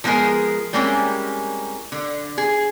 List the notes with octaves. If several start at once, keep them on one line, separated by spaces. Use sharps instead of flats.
F3 G#3 B3 G4 G#4 A#4
G3 G#3 A#3 C4 C#4 E4
D3
G#4